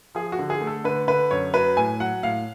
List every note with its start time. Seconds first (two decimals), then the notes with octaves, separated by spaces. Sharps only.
0.15 F3 G#4
0.32 F#4
0.39 D3
0.50 G#4
0.61 A3
0.67 A4
0.84 D3 B4
1.07 D3 B4
1.31 F#2 C#5
1.54 F#3 B4
1.77 A2 G#5
2.00 F#3 F#5
2.23 A2 F5